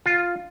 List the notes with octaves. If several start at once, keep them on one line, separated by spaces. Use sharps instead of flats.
F4